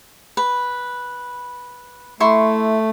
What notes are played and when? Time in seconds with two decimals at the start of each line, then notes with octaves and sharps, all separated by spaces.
0.37 B4
2.20 A3 E4 C6 C#6